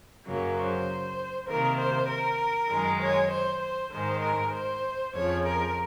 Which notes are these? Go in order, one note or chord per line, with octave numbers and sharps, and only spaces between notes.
F#2 C#3 F#3 A#3
C5
C3 D#3 A#3 A#4
C5
A#4
F#2 D#3 G#3
C#5
C5
C5
G#2 D#3 G#3 C5
A#4
C5
F2 C#3 F3 C#5
A#4